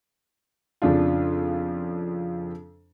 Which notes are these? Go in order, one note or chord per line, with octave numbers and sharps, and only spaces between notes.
F2 C#3 F3 D4 F4